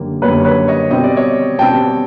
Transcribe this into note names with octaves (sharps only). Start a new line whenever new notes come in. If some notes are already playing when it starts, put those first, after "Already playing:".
Already playing: F#2 D3 G3 A#3
F#2 D3 G3 A#3 B4 C#5
B4 C#5
C#5 D#5
B2 G3 C4 D#5
D5
C#5 D#5
B2 G3 C4 G5 A5